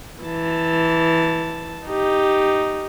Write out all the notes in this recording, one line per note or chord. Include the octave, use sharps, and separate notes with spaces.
E3 A5
D#4 G4